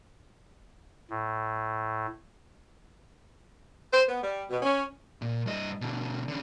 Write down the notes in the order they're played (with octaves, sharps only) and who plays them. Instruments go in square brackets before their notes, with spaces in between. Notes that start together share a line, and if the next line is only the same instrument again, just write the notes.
[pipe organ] A2
[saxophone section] C5
B3
G3
B2
C#4
[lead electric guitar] A#2
G2 D#5
B2 D3
D3 C#4